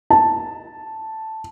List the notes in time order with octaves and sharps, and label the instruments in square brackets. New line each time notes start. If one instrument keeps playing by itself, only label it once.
[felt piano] A5